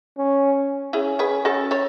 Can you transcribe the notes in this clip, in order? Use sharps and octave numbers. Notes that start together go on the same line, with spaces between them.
C#4
C#4 E4 G#4
G#4 B4
F#4 A4
A4 C#5